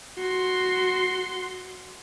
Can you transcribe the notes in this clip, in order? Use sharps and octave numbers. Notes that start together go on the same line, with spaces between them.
F#4 C6